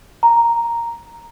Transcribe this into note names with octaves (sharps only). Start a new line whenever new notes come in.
A#5